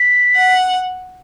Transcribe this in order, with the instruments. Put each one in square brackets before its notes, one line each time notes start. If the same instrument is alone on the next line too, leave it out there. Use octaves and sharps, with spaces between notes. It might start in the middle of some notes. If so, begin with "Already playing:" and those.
Already playing: [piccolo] B6
[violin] F#5